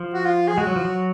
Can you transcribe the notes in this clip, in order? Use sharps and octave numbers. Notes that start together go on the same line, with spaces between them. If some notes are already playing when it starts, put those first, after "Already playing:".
Already playing: F3
F#4
F4
G#4
G#3 F#4
F#3
F3
F#3